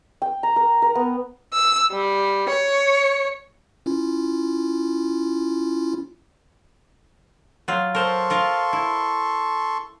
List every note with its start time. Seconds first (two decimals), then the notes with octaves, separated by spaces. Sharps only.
0.22 G5
0.43 A#5
0.56 A#4
0.82 A#4
0.95 B3
1.55 E6
1.91 G3
2.49 C#5
3.86 C#4 E4 F4
7.68 F#3 F4
7.95 A4 A#4 C5 C6 C#6
8.30 F4 A#4 F5
8.73 E4